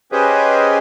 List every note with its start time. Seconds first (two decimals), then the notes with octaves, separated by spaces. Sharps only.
0.12 C#4 G4 G#4 B4 C5 D#5